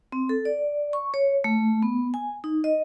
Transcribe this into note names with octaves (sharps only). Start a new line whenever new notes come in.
C4
A4
D5
C#6
C#5
A3
B3
G#5
D#4
D#5